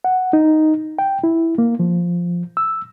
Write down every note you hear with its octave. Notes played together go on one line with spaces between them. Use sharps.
F#5
D#4
G5
E4
A#3
F3
E6